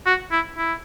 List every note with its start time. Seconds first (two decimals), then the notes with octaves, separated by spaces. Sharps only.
0.06 F#4
0.31 E4
0.57 E4